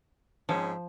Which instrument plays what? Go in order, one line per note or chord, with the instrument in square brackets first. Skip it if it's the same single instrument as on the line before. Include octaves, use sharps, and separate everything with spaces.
[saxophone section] G#2 C4 C#4 [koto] F3